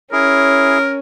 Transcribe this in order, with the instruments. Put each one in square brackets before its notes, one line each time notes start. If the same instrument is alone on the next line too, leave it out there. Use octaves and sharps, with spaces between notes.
[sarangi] C#4 [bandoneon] E4 G#4 [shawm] A#4